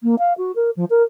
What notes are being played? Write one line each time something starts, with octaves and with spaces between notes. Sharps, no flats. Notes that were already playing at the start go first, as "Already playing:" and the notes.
A#3
F5
F#4
A#4
F3
A#4